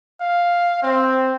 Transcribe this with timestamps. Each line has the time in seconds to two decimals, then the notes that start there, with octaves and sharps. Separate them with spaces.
0.21 F5
0.83 C4